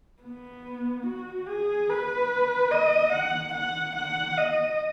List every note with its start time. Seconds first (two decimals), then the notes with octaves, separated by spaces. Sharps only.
0.23 B3
1.07 F#4
1.48 G#4
1.90 B4
2.72 D#5
3.13 F#5
3.54 F#5
3.96 F#5
4.38 D#5